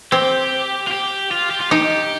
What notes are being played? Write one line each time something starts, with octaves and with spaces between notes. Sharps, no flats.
C4 G4
F4
G4
F4
G4
F4
D#4 G4